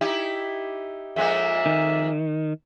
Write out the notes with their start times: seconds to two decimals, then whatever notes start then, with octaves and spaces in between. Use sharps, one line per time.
0.01 D#4 E4 G4
1.16 F2 G#3 A#3 E5
1.66 D#3